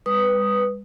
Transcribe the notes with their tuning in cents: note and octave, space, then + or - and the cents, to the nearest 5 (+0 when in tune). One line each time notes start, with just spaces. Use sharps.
G3 +45 B4 +0 D#6 +0